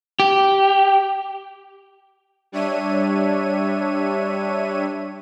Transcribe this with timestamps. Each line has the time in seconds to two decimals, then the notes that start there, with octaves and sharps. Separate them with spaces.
0.20 G4
2.52 G3 D4 C#5 E5 D#7